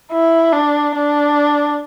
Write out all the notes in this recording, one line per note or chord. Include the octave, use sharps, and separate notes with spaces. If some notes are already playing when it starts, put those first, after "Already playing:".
E4
D4
D4